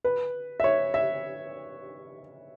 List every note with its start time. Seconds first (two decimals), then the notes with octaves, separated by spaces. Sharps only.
0.04 B4
0.60 E5
0.64 C#5
0.94 E5